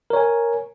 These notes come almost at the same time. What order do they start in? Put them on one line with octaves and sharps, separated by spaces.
A#4 C#5 G#5